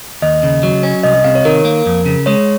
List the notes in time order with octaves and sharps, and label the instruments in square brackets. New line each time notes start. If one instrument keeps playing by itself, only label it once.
[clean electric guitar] D#2 [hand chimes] D#5
[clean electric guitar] C#3
F#3
C#4
[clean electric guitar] C2 [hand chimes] D#5
[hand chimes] D#5
[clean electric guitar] C3 [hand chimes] F5
[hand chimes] C#5
[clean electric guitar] D#3 [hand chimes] A#4
[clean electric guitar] A#3
F2
C#3
[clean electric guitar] G#3 [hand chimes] C#5